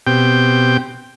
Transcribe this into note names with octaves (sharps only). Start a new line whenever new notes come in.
B2 C4 G4 G5